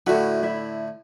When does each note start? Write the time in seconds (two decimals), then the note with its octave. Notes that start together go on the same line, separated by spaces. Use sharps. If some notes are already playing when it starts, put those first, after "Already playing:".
0.07 A2 D3 E4 F#4
0.43 E4